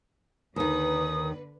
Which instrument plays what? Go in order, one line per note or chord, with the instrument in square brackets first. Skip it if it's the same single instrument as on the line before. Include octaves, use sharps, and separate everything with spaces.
[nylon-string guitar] D#2 D#3 [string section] D3 B4 [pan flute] D#6